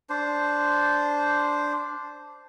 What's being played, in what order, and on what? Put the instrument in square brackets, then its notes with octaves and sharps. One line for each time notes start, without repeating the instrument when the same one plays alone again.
[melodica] D4 C5